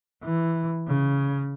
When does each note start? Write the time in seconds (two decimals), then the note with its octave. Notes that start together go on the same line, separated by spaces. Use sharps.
0.24 E3
0.88 C#3